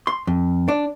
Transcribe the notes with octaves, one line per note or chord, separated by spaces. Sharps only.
C6
F2
D4